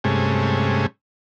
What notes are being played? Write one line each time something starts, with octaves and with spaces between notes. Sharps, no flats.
G2 C3 G#3 A3 C#4